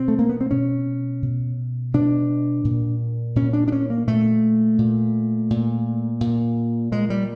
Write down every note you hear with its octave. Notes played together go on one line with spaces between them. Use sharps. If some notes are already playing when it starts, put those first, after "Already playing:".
Already playing: B2 C4
A3
A#3
B3
C4
B2 C#4
B2
B2 D4
A#2
A#2 C#4
D4
D4
C#4
A#3
A#2 A3
A#2
A#2
A#2
A#2 G#3
G3